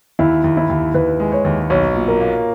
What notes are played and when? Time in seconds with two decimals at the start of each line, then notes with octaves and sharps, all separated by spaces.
0.19 D#2 E4
0.44 D#2
0.57 E4
0.70 D#2
0.94 D#2 B4
1.20 G#3
1.32 C#5
1.45 D#2
1.70 B1 C#5
1.95 A#2
2.08 A#4
2.20 A#3